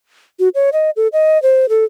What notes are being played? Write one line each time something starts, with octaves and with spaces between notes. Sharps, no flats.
F#4
C#5
D#5
A4
D#5
C5
A4